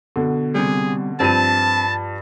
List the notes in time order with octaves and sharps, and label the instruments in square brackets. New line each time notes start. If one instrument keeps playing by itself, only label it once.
[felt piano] B2 D3
[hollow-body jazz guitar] C3 G3 [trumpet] G#4
[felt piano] G2 F3 D#7 [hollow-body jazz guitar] C4 [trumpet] A5